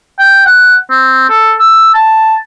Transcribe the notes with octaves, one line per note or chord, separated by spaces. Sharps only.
G5
F#5
C4
A4
E6
A5